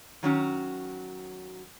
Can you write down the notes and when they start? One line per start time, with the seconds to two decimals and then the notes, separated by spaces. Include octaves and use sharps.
0.23 D#3 F#3 C#4